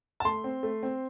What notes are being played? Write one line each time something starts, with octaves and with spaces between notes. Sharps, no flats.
A5
A3 C6
C4
A3
C4